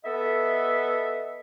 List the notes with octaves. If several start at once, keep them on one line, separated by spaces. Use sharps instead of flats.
B3 A4 D#5 E5